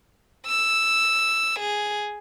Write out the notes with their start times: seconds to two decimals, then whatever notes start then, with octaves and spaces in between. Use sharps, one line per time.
0.46 E6
1.60 G#4